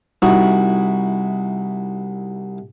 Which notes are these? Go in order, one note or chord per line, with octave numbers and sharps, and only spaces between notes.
C2 D#4 E4 F#4